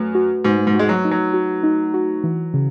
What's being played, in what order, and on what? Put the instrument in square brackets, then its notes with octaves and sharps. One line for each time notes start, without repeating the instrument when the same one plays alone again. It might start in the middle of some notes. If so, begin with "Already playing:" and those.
Already playing: [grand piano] F#2 [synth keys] A3 B4
[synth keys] F#4
[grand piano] G#2 [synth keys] F#4
[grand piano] G#2
[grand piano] G#3 [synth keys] F#4
[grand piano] F#3
[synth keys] D#4
[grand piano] F#3
[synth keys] F#4
D#4
F#4
E3
C#3